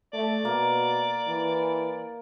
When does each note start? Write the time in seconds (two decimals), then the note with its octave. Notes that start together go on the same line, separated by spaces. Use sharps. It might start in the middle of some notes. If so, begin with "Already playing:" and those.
0.13 A3 D5
0.45 B2 A#3
1.27 E3